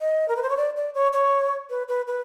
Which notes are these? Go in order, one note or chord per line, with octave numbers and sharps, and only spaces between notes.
D#5
A#4
B4
C5
C#5
D5
D5
C#5
C#5
B4
B4
B4